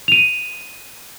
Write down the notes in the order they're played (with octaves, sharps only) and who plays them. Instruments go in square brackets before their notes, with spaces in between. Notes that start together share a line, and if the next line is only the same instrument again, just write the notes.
[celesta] D#7 F7